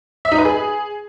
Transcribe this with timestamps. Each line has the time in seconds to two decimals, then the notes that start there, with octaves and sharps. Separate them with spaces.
0.25 E5
0.32 D#4
0.38 B4
0.45 G#4